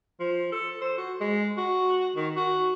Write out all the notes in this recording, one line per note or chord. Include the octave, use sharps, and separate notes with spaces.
F3
A4
C5
F#4
G#3
F#4
D#3
F#4